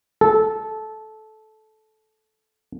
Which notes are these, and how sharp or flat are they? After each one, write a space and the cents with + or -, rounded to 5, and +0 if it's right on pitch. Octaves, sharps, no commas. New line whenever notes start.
A4 -15